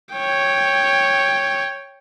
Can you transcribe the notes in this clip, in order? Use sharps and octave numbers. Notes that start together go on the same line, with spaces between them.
C#5 G5